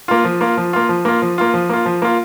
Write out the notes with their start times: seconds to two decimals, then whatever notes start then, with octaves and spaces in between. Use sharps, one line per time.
0.08 A#3 F4
0.25 F3
0.41 A#3 F4
0.57 F3
0.73 A#3 F4
0.89 F3
1.05 A#3 F4
1.22 F3
1.38 A#3 F4
1.54 F3
1.69 A#3 F4
1.86 F3
2.02 A#3 F4